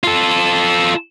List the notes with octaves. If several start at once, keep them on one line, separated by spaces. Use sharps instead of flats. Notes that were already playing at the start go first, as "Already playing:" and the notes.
F4 A4